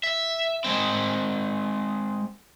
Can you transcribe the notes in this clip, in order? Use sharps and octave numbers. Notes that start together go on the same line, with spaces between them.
E5
G#3 C4